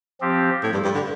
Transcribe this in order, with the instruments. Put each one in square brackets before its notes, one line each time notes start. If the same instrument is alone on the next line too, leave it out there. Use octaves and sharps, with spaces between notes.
[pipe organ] F3 C4 G4
[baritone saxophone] A2
G2
G2
D3